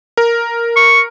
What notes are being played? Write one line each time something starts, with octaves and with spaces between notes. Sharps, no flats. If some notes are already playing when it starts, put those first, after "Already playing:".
A#4
C#6